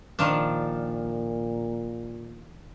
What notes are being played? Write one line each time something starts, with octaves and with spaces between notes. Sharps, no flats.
A#2 D#3 F3 D4